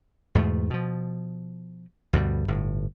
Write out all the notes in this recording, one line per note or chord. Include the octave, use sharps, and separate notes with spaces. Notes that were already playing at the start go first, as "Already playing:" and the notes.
E2 G#2 B2 A3
B2 F3
D2 G2 B2 G3
G1 A2